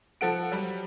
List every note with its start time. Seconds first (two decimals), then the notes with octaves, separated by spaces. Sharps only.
0.21 F3 A4 F#5 D7
0.52 F#3 G3